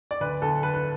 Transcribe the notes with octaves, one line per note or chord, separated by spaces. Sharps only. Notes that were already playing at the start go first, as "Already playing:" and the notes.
D5
D2 B4
D2 A4
D3 B4
B4